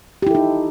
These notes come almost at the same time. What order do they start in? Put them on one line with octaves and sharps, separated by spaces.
G4 E4 A4 D#4